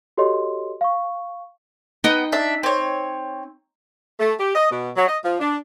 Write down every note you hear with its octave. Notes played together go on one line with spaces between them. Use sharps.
F#4 G4 A4 C#5 D#5 C6
F5 C#6
B3 D#4 D#5 G5
D4 E5
C4 C#5
A3
G4
D#5
B2
F#3
D#5
F3
D4